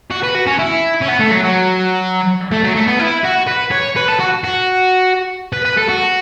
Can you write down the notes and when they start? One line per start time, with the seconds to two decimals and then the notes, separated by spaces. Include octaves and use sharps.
0.11 F#4
0.23 B4
0.35 F#4
0.47 C#4
0.59 E4
1.01 C#4
1.08 B3
1.19 A3
1.31 F#3
1.44 F#3
2.52 A3
2.64 F#3
2.76 A3
2.88 B3
2.99 E4
3.24 F#4
3.48 B4
3.72 C#5
3.96 B4
4.08 A4
4.19 F#4
4.44 F#4
5.53 B4
5.65 B4
5.77 A4
5.89 F#4